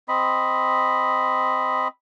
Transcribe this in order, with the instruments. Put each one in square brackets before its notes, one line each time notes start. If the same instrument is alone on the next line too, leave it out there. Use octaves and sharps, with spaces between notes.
[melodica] C4 D#5 B5